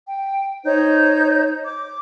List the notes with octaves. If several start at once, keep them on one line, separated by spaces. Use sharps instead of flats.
G5
D#4 C5 C#5 G6
D6